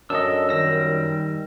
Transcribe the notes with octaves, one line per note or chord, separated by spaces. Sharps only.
F#2 D4 A4 D#5 E6
D#3 G3 E6 A#6